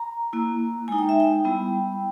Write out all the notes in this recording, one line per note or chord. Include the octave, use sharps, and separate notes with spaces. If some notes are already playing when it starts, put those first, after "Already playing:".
Already playing: A#5
A#3 E4
G#3 D#4 G#5
G5
E5
G5
G3 B3 E4